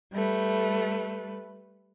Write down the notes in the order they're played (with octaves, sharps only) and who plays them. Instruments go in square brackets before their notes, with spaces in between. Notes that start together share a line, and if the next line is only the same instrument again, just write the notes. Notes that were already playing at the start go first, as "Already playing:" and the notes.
[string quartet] G3 A3 B4